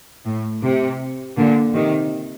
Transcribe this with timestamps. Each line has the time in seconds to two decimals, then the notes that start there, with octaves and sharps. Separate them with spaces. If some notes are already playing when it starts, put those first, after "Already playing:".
0.25 A2
0.62 C3
1.37 A#2 D3
1.74 C3 D#3